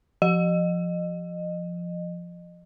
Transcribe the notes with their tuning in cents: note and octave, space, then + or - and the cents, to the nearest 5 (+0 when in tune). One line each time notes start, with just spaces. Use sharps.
F3 +0 D#5 -25